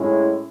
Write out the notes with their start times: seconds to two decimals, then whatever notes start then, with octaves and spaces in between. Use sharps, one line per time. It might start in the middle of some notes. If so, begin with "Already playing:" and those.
Already playing: A2 G#3 C#4 E4